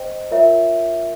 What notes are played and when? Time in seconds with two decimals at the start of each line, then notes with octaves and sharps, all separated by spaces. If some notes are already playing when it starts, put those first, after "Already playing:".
Already playing: C5 D#5 G5
0.31 F4 A#4 C#5 E5